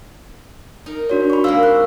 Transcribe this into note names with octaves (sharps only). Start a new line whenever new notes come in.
D#4 A#4
D4 F#4 C#5
B5 C#6
C3 G#3 A#3 F5 E6
F#6